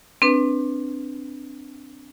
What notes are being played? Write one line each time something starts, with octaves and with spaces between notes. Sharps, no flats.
C4 D4 B4